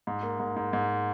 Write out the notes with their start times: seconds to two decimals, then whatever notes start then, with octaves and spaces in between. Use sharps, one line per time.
0.07 G#2
0.23 A#3
0.40 G#2
0.56 G#2
0.73 G#2